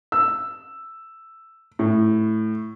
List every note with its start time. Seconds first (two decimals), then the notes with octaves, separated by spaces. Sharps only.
0.12 E6
1.79 A2